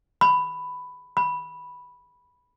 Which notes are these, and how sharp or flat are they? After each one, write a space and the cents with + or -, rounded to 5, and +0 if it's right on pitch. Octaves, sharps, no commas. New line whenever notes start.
B5 +10
B5 -5